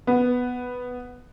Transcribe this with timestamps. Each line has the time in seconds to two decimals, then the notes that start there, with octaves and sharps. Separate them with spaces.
0.07 B3